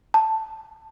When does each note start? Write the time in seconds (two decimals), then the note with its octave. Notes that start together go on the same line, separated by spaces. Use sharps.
0.14 A5